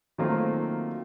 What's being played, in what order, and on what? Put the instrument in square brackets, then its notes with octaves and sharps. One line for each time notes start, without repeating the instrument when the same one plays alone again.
[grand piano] D#3 F#3 A3 A#3 C4 F4